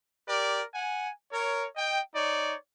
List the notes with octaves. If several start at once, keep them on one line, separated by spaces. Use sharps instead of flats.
G4 A#4 D5
F#5 G#5
A#4 C#5
D#5 G5
D#4 C#5 D5